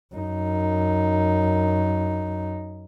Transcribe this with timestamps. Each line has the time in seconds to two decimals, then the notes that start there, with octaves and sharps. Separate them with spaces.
0.15 F#2 D#4